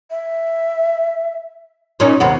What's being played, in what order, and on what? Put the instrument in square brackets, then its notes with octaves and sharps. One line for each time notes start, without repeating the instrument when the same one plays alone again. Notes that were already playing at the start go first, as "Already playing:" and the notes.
[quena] E5
[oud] A#2 C#4 D#4 [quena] C#5
[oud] D#2 C3 B3 [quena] F#5